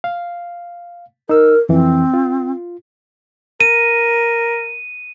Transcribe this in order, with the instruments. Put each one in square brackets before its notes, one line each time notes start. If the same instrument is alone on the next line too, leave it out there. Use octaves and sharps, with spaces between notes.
[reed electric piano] F5
[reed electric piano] D#4 E6 [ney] A#4
[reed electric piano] F2 E3 [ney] C4
[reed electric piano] F4
[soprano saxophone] A#4 [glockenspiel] D#7